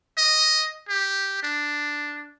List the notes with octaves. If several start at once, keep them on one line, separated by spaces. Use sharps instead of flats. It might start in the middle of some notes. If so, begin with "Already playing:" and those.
D#5
G4
D4